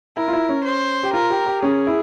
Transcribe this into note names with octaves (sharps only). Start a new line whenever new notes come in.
E4 A#4
F4
E4
C#4
C5
G4
F4 A#4
G4
G4
C#4 G#4
E4